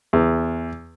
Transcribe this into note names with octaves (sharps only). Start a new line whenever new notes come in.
E2